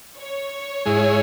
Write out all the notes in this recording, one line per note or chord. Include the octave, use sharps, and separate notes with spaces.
C#5
G#2 G#3 E4 G#4